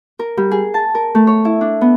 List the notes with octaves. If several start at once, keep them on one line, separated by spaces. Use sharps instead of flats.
A#4
G3
G#4
A5
A#4
A3
C#5
E4
D4
B3